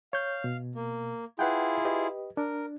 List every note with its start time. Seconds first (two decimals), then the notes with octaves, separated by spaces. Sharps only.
0.13 C#5 F5 G6
0.44 B2
0.75 A#3
1.39 E4 F4 G#4 B4 F#5 G5
1.85 G4 B4 D#5
2.37 D4 A#4